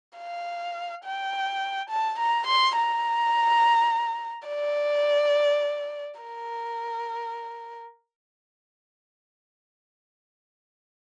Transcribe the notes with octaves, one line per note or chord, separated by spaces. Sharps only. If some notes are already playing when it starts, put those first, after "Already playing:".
F5
G5
A5
A#5
C6
A#5
D5
A#4